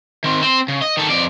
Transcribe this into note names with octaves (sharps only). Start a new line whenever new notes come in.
D#3 C4
C4 C5
C#3
D#5
D#3 A4
F2 D5